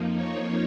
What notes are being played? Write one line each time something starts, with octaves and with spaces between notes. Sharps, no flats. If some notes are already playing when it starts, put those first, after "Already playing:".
Already playing: F2 F3 A#3 D#4
C#5